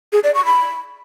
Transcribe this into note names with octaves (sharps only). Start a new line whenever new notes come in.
G#4
D5
C#6
B5